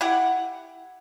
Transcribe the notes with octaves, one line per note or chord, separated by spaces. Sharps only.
E4 G4 F#5